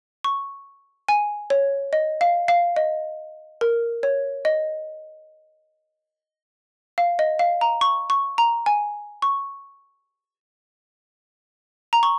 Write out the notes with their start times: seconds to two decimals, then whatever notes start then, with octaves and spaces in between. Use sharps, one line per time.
0.24 C#6
1.08 G#5
1.50 C#5
1.93 D#5
2.21 F5
2.48 F5
2.76 D#5
3.61 A#4
4.03 C#5
4.45 D#5
6.98 F5
7.19 D#5
7.39 F5
7.61 A#5
7.81 C#6
8.10 C#6
8.38 A#5
8.66 G#5
9.22 C#6
11.93 A#5
12.03 C#6